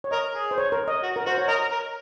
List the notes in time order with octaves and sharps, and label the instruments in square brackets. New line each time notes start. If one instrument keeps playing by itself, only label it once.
[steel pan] C#5
[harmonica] A#4 [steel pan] D#5
[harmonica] G#4
[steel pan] C5
C#5
A#4
D#5
[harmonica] F#4
[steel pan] A#4
[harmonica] F#4 [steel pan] C5
[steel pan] C#5
[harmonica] A#4 [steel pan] D#5
[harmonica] A#4